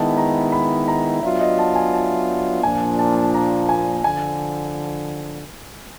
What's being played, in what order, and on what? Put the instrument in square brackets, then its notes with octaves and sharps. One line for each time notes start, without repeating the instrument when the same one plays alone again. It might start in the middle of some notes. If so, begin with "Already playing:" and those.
Already playing: [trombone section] D#3 G#3 B3 E4 [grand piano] A5
[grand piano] A#5
B5
A#5
[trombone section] F#3 B3 D4 F4 [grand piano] E5
[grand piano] D#5
A5
G#5
A5
[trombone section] A#2 F3 A#3 D4 [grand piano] G#5
[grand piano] A5
A#5
G#5
[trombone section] D3 F3 [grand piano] G#5